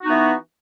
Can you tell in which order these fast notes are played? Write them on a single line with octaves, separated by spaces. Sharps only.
F#4 D#4 B3 E3